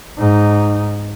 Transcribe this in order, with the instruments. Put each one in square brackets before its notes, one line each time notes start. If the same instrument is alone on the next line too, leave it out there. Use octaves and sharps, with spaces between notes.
[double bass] G#2 D#4